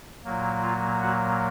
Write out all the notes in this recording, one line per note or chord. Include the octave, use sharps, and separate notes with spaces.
A#2 F#3 A#3
F4
F#4